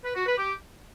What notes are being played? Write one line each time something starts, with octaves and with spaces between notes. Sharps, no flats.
B4
F#4
B4
G4